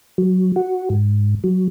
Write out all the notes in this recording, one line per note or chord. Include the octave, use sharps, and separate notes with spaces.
F#3
F#4
G#2
F#3